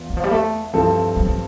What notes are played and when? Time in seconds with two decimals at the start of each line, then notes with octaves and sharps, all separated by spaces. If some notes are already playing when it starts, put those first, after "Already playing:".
Already playing: E2 B3 F4
0.10 E3
0.17 F3
0.24 G3
0.31 A3
0.73 G2 F3 C4 E4 A4
1.16 G3
1.25 A3